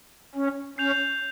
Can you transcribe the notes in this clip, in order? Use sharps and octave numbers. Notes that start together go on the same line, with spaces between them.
C#4
C#4 G6 C7 F7